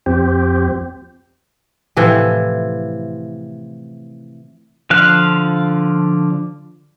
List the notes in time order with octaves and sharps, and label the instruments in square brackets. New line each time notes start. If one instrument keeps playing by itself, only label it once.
[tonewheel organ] F2 C4 G4
[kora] A2 C3 E3 F3
[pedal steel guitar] D3 F3 F5 F#6